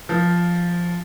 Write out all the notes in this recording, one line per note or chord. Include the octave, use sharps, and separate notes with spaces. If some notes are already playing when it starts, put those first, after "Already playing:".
F3